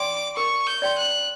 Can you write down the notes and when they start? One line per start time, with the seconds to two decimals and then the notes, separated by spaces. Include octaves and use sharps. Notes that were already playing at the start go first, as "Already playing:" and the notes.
Already playing: D5 G5 C6 D6
0.36 A#4 C#6
0.67 G6
0.82 D5 G5 C6
0.98 F#6